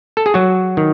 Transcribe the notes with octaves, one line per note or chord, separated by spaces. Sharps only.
A4
G#4
F#3 F#4
D#3